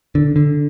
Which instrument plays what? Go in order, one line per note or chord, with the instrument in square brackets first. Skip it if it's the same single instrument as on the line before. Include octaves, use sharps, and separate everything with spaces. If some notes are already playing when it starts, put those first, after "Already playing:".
[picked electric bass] D3
D3